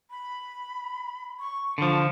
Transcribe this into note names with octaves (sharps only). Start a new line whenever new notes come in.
B5
C#6
D3 F3